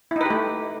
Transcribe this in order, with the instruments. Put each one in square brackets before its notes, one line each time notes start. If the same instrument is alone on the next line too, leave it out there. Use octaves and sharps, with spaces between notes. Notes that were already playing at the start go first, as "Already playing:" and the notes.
[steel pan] E4
D#4
B4
G4
A3